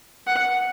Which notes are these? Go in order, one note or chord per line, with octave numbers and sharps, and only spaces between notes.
F#5